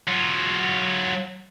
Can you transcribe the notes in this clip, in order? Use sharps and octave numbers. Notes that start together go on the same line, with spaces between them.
F#3 F4